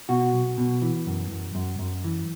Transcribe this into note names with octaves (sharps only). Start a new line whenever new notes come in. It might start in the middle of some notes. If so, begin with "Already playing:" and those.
B2 F#4
B1
B2
E3
F#2
F#2
F#2
F#2
E3